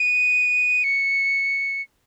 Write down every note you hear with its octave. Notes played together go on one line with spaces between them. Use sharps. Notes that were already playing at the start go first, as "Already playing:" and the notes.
Already playing: D#7
C#7